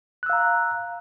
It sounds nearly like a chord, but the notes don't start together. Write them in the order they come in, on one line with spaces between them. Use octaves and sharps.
F#6 E6 F5 A#5